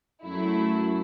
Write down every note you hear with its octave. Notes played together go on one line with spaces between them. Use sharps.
F#2 F#3 A3 E4